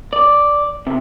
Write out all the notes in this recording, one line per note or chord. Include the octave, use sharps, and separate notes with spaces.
D5
C3